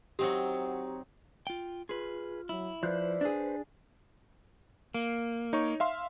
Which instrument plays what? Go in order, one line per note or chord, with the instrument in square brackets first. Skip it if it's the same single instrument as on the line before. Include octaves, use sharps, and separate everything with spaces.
[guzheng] F#3 C4 D#4 [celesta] G4
[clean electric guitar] F4 G5
[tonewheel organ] F4 [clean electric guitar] G#4 B4
[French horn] F#3 [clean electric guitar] E4
[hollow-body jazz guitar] F3 [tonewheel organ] B4 C5 [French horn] D5
[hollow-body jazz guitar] D4 G#4
[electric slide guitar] A#3
[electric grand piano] D#4 C#5 C#6
E5 F5 C6